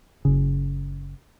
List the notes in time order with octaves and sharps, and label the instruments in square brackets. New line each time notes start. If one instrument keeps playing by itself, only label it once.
[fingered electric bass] F#1 C#3